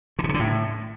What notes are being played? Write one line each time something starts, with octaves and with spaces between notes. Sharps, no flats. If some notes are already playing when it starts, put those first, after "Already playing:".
D3
B2
C3
D3
A2